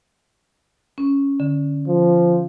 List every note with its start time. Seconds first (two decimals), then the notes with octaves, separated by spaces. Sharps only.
0.98 C#4
1.40 D3
1.88 F3